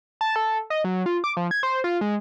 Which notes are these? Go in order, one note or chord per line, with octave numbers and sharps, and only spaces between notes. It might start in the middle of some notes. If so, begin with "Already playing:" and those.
A5
A4
D#5
F#3
F4
D6
F3
G#6
C5
F4
G#3